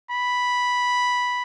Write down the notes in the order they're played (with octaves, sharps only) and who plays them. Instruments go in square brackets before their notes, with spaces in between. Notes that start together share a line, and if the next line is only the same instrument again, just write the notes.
[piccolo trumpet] B5